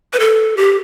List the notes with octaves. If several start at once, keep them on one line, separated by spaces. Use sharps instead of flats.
B4
A4
G4